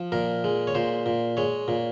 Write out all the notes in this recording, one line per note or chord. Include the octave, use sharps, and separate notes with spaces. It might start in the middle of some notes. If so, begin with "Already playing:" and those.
Already playing: F3
A#2 A#4
G#3
C#5
A#2 C5
A#2
G#3 C#5
A#2